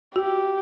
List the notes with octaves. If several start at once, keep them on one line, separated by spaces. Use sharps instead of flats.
F#4 G4